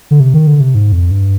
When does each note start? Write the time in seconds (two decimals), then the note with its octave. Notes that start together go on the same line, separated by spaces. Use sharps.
0.11 D3
0.20 C3
0.34 D#3
0.47 D3
0.60 C3
0.75 G#2
0.92 F2
1.11 G2